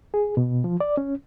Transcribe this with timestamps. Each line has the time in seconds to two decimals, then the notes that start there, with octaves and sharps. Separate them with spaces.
0.14 G#4
0.37 B2
0.64 F3
0.80 D5
0.97 C#4